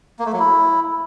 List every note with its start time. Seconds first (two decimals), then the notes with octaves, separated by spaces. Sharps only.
0.19 A#3
0.26 A3
0.33 F#3
0.39 E4